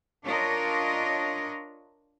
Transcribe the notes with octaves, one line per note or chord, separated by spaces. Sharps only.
D4 F4 A#4 C#5 D#5